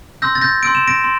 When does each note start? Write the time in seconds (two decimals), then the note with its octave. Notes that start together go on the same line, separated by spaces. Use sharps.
0.22 C6 E6 G6 A#6
0.35 A6
0.42 G6 A#6
0.63 C6 E6 G6 D7
0.75 E7
0.88 A#6 D7
1.04 C6